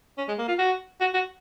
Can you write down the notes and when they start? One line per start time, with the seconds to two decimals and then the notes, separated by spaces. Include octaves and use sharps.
0.18 C#4
0.28 G#3
0.39 A#3
0.48 F4
0.59 F#4
1.01 F#4
1.14 F#4